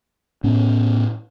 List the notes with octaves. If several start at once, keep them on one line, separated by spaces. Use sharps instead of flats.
A2 B3 C#4